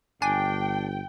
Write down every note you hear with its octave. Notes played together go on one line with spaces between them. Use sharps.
G1 D4 G5 G#5